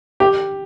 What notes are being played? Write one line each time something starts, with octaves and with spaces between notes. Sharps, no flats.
G4